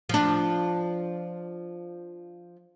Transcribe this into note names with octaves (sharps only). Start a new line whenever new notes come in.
F3 D4